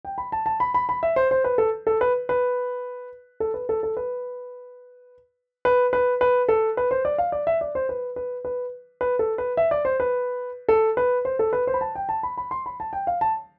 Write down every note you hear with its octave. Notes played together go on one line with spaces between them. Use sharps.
G5
B5
A5
A5
B5
B5
B5
E5
C5
C5
B4
A4
A4
B4
B4
A4
B4
A4
A4
B4
B4
B4
B4
A4
B4
C5
D5
F5
D5
E5
D5
C5
B4
B4
B4
B4
A4
B4
E5
D5
C5
B4
A4
B4
C5
A4
B4
C5
B5
A5
G5
A5
B5
B5
C6
B5
A5
G5
F5
A5